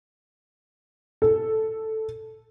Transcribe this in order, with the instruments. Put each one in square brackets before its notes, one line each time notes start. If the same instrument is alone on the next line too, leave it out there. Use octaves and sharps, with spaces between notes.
[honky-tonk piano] A4